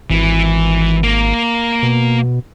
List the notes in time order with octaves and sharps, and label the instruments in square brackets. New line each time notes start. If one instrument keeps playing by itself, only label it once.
[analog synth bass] G#1 [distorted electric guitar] E3
[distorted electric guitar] A#3
[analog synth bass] B2